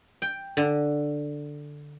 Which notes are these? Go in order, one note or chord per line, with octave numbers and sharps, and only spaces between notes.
G5
D3